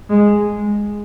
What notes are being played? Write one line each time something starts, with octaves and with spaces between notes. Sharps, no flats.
G#3